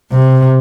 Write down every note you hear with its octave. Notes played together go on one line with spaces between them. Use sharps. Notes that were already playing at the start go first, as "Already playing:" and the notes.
C3